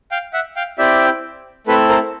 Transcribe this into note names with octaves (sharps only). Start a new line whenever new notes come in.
F5 G5
E5 F#5
F5 G5
C4 E4 G4 D5 E5
A3 C4 E4 A4 B4
A#4 C5